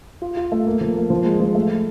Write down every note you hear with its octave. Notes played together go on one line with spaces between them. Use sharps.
F4
F4
A3
A#3
F3
A#3
F3
G#3
F3
A3